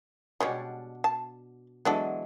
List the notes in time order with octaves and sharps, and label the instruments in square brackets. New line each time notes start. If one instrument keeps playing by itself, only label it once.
[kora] B2 D4 F#5 [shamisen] G3 G#3 C#4
[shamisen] A5
[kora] E3 F#3 G#3 [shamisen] B3 D4 A4